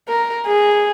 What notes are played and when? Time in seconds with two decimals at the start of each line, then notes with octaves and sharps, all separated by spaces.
0.08 A#4
0.47 G#4